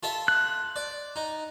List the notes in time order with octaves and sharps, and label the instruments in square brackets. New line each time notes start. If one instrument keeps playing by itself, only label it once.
[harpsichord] F4 A4 E5
[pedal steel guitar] F#6
[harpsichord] D5
D#4